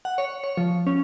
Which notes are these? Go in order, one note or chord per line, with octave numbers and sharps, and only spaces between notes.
F#5
C#5
C#5
F3
C#4